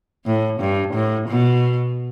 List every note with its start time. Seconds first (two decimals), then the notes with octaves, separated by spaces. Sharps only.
0.25 A2
0.60 G2
0.94 A2
1.28 B2